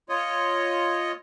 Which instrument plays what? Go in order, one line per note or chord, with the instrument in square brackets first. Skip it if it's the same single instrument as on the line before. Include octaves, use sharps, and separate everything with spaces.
[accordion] F4 C#5 D#5